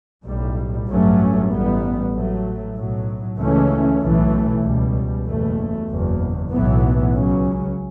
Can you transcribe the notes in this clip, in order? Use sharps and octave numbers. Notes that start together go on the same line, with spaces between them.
B1 A2 G3
A1 G2 F#3 A3 C#4
A1 A2 G3 B3
A1 A2 F#3 A3
B1 A2 F#3
C#2 C#3 E3 A3 C#4
B1 A2 E3 A3
C#2 B2 G3
F#1 E2 B2 A3
F#1 E2 B2
B1 A2 E3 B3
C#2 C#3 F#3 C#4